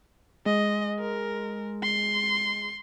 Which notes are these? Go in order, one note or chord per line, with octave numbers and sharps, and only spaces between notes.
G#3 D#5
A#4
C6